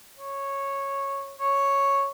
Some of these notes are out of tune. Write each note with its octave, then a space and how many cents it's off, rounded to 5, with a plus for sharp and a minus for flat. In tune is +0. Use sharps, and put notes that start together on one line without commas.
C#5 -10
C#5 +0